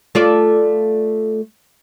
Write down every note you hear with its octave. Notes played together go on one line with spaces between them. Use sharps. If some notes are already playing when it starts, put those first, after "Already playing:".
A3 F4 D5